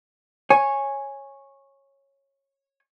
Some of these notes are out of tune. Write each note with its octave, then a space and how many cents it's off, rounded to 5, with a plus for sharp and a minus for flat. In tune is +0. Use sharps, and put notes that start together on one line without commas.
C#5 -10 G#5 +0